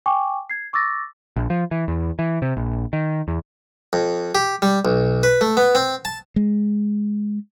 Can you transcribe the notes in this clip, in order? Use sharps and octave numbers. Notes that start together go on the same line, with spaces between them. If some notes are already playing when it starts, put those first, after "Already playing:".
G5 G#5 C#6 D6
G#6 C7
C#6 D6 E6 A6 A#6
A#1
F3
E3
E2
E3
C3
A#1
D#3
E2
F2
G4
G3
B1
B4
A3
B3
C4
A5
G#3